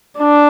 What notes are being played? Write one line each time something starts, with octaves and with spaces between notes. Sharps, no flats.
D4